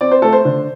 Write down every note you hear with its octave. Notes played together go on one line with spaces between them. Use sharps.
C4 D5
C5
A3 A4
C5
D3